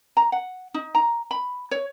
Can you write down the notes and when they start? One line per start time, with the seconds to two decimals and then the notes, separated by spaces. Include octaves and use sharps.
0.17 A#5
0.32 F#5
0.74 D#4
0.95 A#5
1.31 B5
1.71 C#5